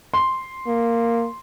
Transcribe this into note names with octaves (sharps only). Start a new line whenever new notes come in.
C6
A#3